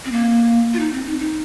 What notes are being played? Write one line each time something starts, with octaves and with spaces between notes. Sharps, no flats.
C4
A#3
F4
D#4
C4
D#4
D#4